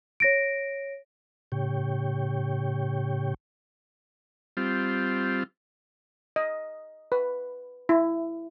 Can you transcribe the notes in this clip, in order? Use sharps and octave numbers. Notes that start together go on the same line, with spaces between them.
C#5 A#6 D7
A2 C#3 G4 C#5 G5
G3 C4 F4
D#5
B4
E4